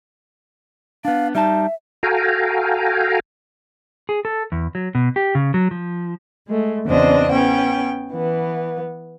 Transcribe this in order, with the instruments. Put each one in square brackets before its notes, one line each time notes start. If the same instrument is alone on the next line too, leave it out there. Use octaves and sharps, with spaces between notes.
[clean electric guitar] B3 D4 [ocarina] F5
[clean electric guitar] G3 D#4 A5 [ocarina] E5
[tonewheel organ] F#4 A4 F5 G5 G#5 A#5
[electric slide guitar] G#4
A4
E2
F#3
B2
G4
C#3
F#3
F3
[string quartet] G#3 A3
E2 C#3 C4 D4 C5 D#5
B3 C#4 G5
E3 B3